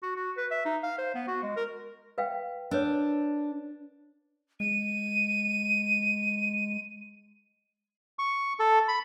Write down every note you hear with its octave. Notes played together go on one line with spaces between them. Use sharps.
F#4
F#4
B4
E5
D#4
F5
C5
B3
F#4
G#3
A#4
B4 F5 G5
D4 A#4 B4 C#5
G#3 D#7
C#6
A4
B5